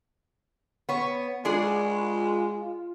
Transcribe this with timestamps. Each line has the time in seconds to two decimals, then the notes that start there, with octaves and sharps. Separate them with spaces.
0.89 B3 C#5
1.45 G#3 D4 F4 G#4 D5